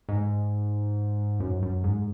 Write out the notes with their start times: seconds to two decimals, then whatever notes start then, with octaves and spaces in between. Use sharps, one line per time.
0.09 G#2
1.40 F#2
1.63 F#2
1.84 G#2